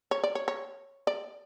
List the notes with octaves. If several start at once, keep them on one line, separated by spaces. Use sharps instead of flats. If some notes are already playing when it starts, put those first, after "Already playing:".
C#5
D5
C#5
C#5
D5